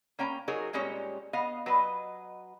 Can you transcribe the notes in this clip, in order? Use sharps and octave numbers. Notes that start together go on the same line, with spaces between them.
A#3 C#4 G5 A#5
F#3 D#4 F#4 G#4 A#4
A#2 G3 G#3 C4 C#4 C#5
B3 D#5 F5
F#3 B4 D#5